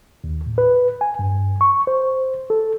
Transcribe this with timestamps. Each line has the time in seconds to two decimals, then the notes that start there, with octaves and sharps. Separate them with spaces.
0.24 D#2
0.46 A2
0.58 B4
1.01 G#5
1.19 G2
1.61 C#6
1.87 C5
2.50 A4